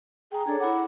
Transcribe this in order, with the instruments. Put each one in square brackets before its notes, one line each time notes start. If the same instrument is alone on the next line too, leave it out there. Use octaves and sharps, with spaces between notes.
[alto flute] G#4 [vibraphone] G5 G#5 A#5
[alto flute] D4 [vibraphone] G#4 A4 C#5
[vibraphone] E4 B5 D6 [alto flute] F#5